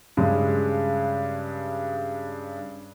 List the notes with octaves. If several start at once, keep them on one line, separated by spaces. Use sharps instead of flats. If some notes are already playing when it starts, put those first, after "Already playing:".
G2 C#3 G#3